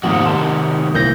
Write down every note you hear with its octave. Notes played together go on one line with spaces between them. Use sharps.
F2 G#2 C3 D#3 A#3 F#4 D#5
A5 C6
C2 G2 A#2 E3 G6 A#6